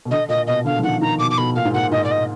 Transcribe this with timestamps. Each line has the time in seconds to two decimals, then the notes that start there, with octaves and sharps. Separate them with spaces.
0.05 B2
0.11 D3 D#5
0.29 A#2 D#5
0.47 B2 D#5
0.65 D3 F5
0.79 F3
0.83 D#3 F#5
1.02 D#3 A#5
1.19 B2 D6
1.31 D6
1.38 B2 B5
1.56 A#2 F5
1.65 G#2
1.74 A#2 F#5
1.92 G#2 D#5
2.04 D5
2.11 D#5